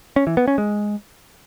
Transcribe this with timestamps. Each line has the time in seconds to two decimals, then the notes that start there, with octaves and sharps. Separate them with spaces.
0.16 C#4
0.27 E3
0.37 B3
0.48 C#4
0.58 G#3